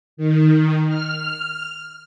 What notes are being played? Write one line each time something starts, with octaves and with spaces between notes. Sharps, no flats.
D#3
F6